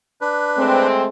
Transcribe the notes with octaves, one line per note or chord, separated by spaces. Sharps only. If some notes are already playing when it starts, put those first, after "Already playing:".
D4 B4
G#3 A3 C4